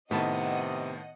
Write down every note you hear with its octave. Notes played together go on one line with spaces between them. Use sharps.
A2 C3 D#3 B3 D#5 F#5 A5